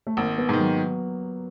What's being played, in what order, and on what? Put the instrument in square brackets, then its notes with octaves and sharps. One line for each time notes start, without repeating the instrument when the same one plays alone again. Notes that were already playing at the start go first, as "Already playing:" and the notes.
[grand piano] A3
[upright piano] G#1 [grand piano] A#3
[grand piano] B3
[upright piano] G#2 D#3
[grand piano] F#3